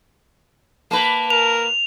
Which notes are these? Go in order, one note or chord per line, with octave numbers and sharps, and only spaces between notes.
A#3 B4 A5
A#4 F7